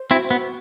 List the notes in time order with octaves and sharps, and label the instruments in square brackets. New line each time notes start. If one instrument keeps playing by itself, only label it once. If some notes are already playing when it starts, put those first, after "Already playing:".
Already playing: [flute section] C5
[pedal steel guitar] C4 E4 [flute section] F#4
[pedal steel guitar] B3